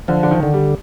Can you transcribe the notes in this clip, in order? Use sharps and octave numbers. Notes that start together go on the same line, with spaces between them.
D3 F3
D3
D#3
D3
G3